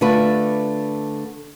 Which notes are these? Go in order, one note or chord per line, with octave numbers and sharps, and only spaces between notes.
D3 A3 F4 B4